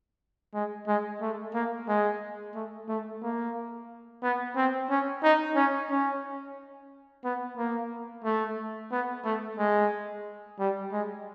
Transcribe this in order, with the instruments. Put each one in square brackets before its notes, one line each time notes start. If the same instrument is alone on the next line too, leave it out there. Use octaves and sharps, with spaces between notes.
[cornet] G#3
G#3
A3
A#3
G#3
A3
A3
A#3
B3
C4
C#4
D#4
C#4
C#4
B3
A#3
A3
B3
A3
G#3
G3
G#3